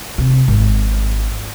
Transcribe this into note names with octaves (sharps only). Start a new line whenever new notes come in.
C3
G#1